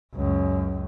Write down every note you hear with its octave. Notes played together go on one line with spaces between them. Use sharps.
C#2 F#2